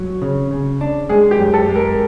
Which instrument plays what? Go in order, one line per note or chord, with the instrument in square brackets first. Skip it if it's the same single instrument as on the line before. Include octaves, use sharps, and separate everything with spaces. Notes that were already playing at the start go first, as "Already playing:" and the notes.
Already playing: [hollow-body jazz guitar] F#3
C#3
C#3
D4
[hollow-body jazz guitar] G#3 [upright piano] G#4
[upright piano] G4
[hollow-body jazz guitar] F#2
[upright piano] A4
[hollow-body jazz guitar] G#3
[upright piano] A#4